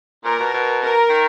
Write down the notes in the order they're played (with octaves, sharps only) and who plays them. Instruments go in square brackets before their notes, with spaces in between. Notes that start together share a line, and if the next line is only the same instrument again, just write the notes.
[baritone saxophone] A#2 [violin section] A#4
[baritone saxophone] B2
B2
[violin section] A#4
[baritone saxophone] D#3